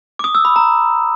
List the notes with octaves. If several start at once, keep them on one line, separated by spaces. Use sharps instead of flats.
D6
D#6
E6
B5
A#5